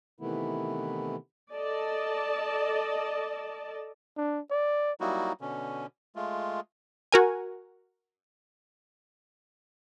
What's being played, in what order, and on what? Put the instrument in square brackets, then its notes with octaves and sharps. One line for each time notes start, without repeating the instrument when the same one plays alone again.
[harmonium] C3 D#3 E3 A3 B3 E4
[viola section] A4 D5 D#5 A5
[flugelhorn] D4
D5
[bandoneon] F#3 G3 A#3 D#4 E4 F#4
B2 D3 C#4
G#3 A3 F4
[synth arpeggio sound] F#4 A#4 G#5